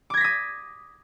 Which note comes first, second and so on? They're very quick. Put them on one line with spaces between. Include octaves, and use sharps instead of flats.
D6 G#6 A#6 B6 D#6